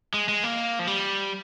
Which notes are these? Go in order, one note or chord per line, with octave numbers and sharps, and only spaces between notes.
G#3
G#3
A#3
F3
G3